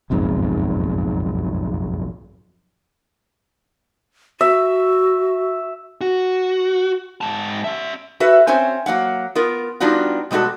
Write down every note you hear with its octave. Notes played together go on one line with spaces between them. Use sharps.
F#1 B1 F2 G#2
F#4 E5
F#4
G#2 A5
C#4 E5
F#4 A4 B4 E5
C4 C#4 C5 C#5 G#5
F#3 A#3 F5 F#5
B3 F4 A#4
G3 B3 D4 D#4 F4 F#4
B2 G3 G#3 F#4 A4